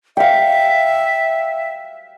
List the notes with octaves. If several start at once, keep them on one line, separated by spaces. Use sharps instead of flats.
E5 F5 G5